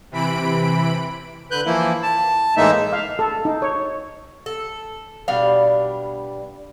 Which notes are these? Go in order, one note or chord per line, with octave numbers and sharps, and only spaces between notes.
C3 E3 B5 D7
D3 B4 F#6 G6
E3 F3 A#3 E4
A5
A2 E3 G#3 A#3 D#4 E5
F5
A4
D#4
C#5
A4
B2 G3 D4 F5